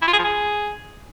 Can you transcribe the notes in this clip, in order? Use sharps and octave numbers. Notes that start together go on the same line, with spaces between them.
E4
F4
G#4
F3
G#4